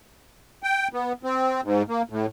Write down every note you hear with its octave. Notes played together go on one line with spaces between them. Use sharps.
G5
B3
C4
G#2
A#3
A2